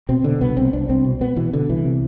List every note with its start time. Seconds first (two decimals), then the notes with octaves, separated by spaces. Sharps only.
0.09 B2 C4
0.24 B2 D3
0.41 C2 B3
0.57 C2 C4
0.73 C2 D4
0.89 C2 C4
1.05 B2
1.21 B2 B3
1.36 B2 E3
1.53 B2 D3
1.69 C2 E3
1.85 C3